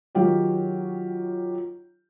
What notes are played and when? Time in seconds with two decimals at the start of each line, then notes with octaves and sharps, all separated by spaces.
0.15 D#3 F#3 F4 G4 C#5